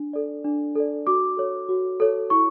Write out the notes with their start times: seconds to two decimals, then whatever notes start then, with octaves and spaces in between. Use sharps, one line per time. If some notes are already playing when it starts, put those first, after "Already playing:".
Already playing: D4
0.13 A4 D5
0.44 D4
0.75 A4 D5
1.07 F#4 D6
1.37 A4 C#5
1.69 F#4
2.00 A4 C#5
2.30 E4 C#6